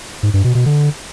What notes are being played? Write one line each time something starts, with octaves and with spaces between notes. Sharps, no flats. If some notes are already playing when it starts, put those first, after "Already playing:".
G#2
G2
B2
B2
D3